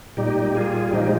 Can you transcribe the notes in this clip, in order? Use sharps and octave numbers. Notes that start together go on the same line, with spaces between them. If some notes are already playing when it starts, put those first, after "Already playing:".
A#2 G3 D#4 G4
G4
F4 G#4
A#2 F3 G#3 D#4 G4